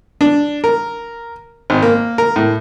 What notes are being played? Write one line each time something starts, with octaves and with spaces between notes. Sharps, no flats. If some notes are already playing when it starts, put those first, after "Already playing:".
D4
A#4
G#1
A#3
A#4
A2